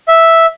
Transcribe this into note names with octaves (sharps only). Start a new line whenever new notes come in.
E5